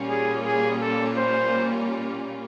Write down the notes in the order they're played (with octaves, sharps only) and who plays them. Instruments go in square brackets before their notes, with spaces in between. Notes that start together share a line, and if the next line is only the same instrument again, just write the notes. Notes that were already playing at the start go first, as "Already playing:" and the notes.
Already playing: [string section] A#2 G3 A#3 C#4 F4
[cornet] G#4
G#4
A4
C5